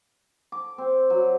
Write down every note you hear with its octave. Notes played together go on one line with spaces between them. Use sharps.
D6
C4
F#3